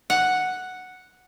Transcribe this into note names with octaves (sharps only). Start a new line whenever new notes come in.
F#5